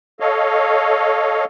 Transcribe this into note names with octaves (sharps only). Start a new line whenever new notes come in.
A4 C#5 D#5 F5